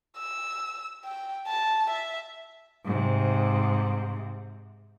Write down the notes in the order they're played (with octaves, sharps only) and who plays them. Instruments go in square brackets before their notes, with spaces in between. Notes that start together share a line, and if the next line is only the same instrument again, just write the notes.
[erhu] E6
G5
A5
E5
[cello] G#2 C3